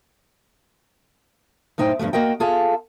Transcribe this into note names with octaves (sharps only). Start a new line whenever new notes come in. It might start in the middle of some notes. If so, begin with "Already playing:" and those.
F#2 A2 D#4 C5 G5
E2 G2 E3 F3 A3
A#3 F#4 A#4 D#5 G5
F4 G#4 A4 D5 F5